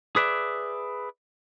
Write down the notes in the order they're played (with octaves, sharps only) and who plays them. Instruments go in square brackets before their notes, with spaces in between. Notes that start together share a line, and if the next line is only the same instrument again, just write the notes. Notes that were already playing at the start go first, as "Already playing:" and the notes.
[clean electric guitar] G#4 B4 D5 E5